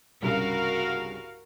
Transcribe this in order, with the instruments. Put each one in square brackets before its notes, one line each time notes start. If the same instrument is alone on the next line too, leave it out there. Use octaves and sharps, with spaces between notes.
[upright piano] C2 G2 C#3 [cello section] F#4 A#4 F5